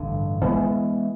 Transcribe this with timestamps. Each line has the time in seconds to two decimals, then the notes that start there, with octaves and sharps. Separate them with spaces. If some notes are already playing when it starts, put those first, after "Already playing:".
Already playing: A1 G2 D3
0.42 E3 G#3 B3